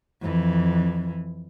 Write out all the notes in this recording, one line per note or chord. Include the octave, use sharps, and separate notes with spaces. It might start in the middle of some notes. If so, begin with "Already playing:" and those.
F2 E3